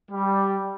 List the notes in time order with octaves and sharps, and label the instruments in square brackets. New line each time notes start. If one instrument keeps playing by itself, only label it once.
[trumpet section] G3